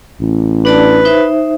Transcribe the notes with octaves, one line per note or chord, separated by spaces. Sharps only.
A1
D4 B4 D5 A5
D#4 C5 E5